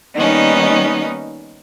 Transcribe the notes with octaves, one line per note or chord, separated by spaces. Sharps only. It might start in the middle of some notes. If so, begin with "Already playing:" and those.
D#3 G3 A#3 B3 C#4 D#4